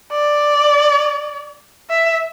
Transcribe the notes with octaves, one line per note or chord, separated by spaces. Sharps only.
D5
E5